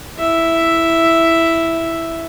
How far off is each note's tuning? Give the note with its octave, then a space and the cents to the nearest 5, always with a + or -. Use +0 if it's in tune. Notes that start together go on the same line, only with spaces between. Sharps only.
E4 +0 E5 +0